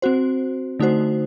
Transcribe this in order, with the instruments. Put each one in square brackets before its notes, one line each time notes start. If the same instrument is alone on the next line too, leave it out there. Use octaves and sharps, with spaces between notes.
[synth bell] C4 F#4 C5
D3 A3 D#4 F#4 C5